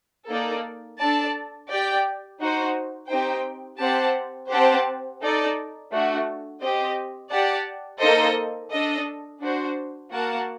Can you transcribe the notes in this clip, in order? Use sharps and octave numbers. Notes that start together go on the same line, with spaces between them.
A#3 D#4 A4 D5
D4 A4 D5 A5
G4 D5 G5
D#4 F#4 C5
C4 D#4 G4 C5 G5
C4 G4 C5 F#5 A5
C4 G4 C5 F#5 A5
D#4 A4 D5
A3 D4 F#4
C4 G4 C5 D#5
G4 D5 F#5 A5
A#3 D#4 A4 C5 D#5
D4 A4 D#5
D4 F#4 C5
A#3 F#4 A#4 F#5 A5